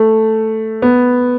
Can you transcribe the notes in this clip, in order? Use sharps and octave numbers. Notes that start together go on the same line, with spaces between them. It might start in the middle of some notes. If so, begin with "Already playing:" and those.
Already playing: A3
B3